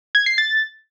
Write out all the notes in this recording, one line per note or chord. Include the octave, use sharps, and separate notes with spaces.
G#6
C7
A6